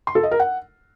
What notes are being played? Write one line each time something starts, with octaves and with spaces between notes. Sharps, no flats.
C6
A4
D#5
A#4
F#5